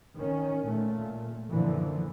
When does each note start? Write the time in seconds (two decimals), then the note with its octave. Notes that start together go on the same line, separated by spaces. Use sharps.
0.15 D#3 C#4
0.65 A#2 A3
1.49 F#2 A#2 D3 E3 F3